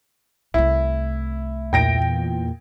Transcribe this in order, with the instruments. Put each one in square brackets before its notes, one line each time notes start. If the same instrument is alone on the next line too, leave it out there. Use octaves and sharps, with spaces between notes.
[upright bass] C2 A3 [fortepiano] E4
[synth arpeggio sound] E2 A#2 [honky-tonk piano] G5 A#6 D7